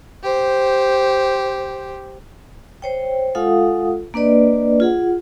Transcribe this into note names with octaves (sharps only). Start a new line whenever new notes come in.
G4 C5
C5 C#5 G5
G#3 F4 A4 F5 F#5 D#6
A#3 D4 B4 D5 D#5
F4 G#4 F#5